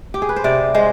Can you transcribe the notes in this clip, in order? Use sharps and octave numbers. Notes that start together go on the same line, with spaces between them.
G4
G#4
B4
C5
C3 D5
G#3 C5